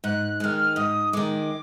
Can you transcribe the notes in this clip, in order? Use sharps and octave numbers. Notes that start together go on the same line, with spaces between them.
G#2 F#6
D#3 G#3 F6 F#6
G#2 D#6
D#3 G#3 D6